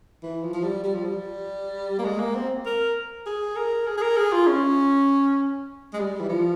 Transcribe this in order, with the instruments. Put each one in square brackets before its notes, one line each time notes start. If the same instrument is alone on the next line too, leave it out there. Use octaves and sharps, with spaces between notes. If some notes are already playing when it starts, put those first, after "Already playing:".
[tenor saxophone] E3
F3
F3
G3
G3
F3
G3
A#3
G#3
A#3
C4
A#4
G#4
A#4
G#4
G#4
A#4
G#4
F4
C#4
G#3
G3
E3
F3